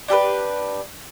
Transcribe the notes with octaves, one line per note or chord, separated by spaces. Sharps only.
D4 G4 A4 B4